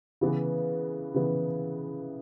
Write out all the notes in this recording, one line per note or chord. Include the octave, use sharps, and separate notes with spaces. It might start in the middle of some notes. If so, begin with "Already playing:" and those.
C#3 E3 B3 E4
C#3 E3 B3 E4